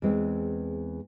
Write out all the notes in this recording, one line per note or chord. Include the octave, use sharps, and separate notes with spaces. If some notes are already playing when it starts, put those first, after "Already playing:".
E2 E3 G#3 C4